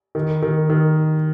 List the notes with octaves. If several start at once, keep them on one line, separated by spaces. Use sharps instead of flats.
D#3
D#3
D#3